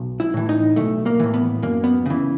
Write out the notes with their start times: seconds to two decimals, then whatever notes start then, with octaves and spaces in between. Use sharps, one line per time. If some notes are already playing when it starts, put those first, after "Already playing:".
Already playing: B1
0.20 E4
0.34 A2 E3
0.49 D#4
0.76 B1 A3
1.06 A#3
1.20 A2 E3
1.34 B3
1.62 F#2 A#3
1.84 B3
2.06 C#3 E3